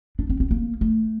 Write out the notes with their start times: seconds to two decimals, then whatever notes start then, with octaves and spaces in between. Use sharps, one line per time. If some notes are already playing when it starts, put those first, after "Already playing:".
0.19 D4
0.30 C4
0.40 C4
0.51 A#3
0.81 A3